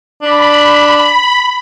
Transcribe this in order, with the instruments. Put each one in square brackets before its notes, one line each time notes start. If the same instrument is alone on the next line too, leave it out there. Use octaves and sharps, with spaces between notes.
[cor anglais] D4 [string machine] B5